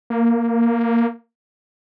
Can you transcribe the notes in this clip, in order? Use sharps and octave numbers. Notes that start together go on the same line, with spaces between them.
A#3